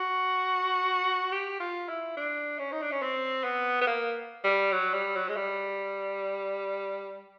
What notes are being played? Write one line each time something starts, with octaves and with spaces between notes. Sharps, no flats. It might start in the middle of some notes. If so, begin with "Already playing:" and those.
Already playing: F#4
G4
F4
E4
D4
C#4
D#4
D4
C#4
C4
B3
B3
A#3
G3
F#3
G3
F#3
G#3
G3